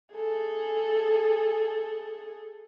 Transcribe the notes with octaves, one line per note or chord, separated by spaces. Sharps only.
G#4 A4